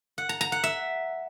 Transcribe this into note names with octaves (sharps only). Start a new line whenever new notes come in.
F#5
A#5
A#5
F#5
E5